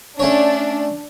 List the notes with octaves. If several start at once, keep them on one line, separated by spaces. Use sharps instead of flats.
A3 C#4 D4 C#5